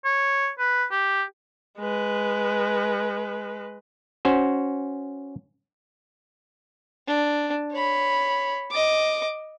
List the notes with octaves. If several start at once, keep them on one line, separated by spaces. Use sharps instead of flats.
C#5
B4
G4
G#3 B4
C#4 F#4 C5
D4
C#5 B5
D#5 D6